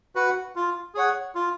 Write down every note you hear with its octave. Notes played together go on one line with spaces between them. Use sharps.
F#4 B4 F#5
F4
G#4 C#5 F#5
F4